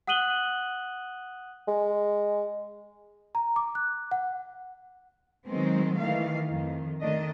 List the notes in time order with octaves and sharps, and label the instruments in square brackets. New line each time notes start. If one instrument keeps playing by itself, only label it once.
[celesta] F#5 D#6 F#6 D#7 F#7 G7
[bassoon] G#3
[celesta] A#5
D6
F#6
F#5
[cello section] D#3 F#3 G#3 B3 C4
D#3 E3 A3 F5
F2 D#3
D#3 A3 D4 D#5